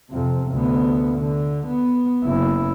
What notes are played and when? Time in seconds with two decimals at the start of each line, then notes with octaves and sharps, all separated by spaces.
0.10 F2 C3
0.52 D2 B3
1.18 D3
1.67 B3
2.24 F#1 E4